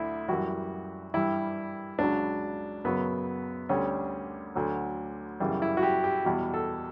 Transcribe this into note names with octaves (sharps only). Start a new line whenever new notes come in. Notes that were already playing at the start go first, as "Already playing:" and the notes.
Already playing: D2 D3 E4
F#2 E3 G3 F#4
G2 E3 G3 E4
C#2 C#3 F#3 D4
F#2 C#3 F#3 B3
D2 D3 G3 C#4
D2 D3 F#3
F#2 C#3 E3 G3
E4
F#4
G4
G4
E2 B2 G3 F#4
A4